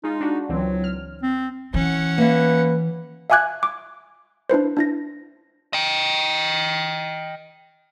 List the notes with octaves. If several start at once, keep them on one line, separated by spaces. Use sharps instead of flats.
G#3 D#4 F4
D4 F#4
C#2 E3 F#3 C4
F6
C4
E3 C#4 F#5
A#3 B4 E5
E5 F5 G#5 D6 F#6 G#6
D6
D4 E4 B4 C5
D4 E4 A#6
D#5 G5